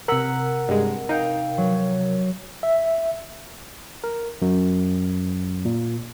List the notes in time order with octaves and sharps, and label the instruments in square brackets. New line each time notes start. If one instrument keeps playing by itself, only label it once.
[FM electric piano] C3 A#4 [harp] F#5 E6 B6
[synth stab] G2 G#3
[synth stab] D#4 [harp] F5 G5
[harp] F#3
[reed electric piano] E5
[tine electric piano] A#4
F#2
A#2